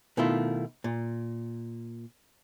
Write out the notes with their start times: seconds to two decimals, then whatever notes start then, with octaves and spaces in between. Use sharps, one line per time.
0.17 B2 D#3 A3 E4 F4
0.84 A#2